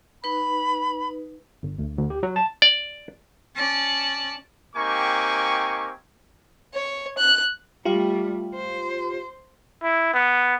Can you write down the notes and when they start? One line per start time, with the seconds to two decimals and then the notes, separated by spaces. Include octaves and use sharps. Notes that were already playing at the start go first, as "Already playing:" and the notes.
0.24 D#4 B4 B5
1.63 G1
1.78 D2
1.97 D2
2.10 G4
2.23 F#3
2.36 A5
2.62 D5
3.56 C#4 D5 A5
4.76 A#3 C4 D#4 G4 G#5 C#6
6.74 C#5
7.18 F#6
7.85 G3 A3 F4 G4 F5
8.55 C5
9.82 E4
10.14 B3